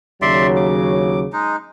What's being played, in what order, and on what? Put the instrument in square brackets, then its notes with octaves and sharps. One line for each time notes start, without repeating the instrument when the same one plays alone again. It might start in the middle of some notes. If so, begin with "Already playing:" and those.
[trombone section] D#2 C#3 F#3 [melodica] D5 E5 C6
[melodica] D6
G#3 D#4